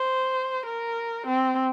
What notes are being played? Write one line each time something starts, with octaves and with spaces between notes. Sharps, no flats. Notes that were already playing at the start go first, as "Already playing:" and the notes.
Already playing: C5
A#4
C4